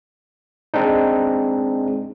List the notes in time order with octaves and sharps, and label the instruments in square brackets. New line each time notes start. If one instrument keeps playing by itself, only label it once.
[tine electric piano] G#3 C4 D4 D#4